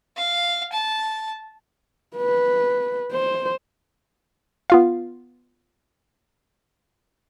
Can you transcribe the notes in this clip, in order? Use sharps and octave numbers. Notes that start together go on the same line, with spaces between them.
F5
A5
B4
C5
B3 F4 F5